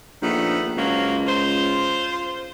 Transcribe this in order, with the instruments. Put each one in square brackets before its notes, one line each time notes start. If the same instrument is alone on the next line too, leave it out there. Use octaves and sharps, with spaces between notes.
[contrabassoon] A#1 [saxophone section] D#3 A3 B3
[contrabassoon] C#2 [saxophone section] F3 F#3 A#3
[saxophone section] F4 C5